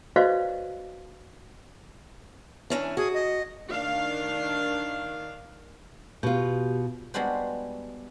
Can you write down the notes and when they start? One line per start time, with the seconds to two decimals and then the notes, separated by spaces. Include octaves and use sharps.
0.16 F#4 B4 C5 D5 D#5 F5
2.70 E3 C#4 D4
2.97 F#4 G#4
3.14 D#5
3.69 D#3 D4 F5
6.23 B2 F4 G4
7.14 G3 G#3 B3 D4 F#4 C5